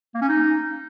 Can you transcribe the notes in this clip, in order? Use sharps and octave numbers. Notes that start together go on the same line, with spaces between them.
A#3
C#4
D#4